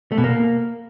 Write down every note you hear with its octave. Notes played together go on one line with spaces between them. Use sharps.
A3
B2
A#3